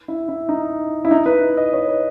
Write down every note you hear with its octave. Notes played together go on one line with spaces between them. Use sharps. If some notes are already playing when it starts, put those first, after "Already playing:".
E4
E4
D#4
E4
D#4
B4
D#5
C#5
B4